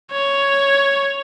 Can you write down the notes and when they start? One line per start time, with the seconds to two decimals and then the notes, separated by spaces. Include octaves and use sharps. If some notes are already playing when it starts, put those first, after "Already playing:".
0.12 C#5